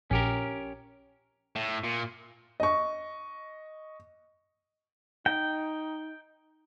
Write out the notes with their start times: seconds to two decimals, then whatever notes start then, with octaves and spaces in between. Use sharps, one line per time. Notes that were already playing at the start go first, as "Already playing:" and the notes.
0.11 A#1 C#4 G4 A#4
1.56 A2
1.84 A#2
2.60 D#5 C#6
5.26 D#4 G5